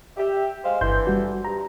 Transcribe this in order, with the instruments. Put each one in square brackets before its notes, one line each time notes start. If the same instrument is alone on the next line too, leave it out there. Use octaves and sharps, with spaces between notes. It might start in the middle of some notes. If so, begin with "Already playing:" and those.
[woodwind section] G4 E5
G#3 C5 F5
[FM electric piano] G1 C6 G6 [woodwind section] D3 E3
[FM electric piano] G3 F#4
[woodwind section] G2 [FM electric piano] A#5